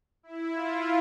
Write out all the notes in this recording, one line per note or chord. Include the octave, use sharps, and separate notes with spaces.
E4
F4